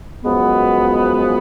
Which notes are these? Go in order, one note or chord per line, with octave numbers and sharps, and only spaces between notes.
F#2 F3 G#3 B3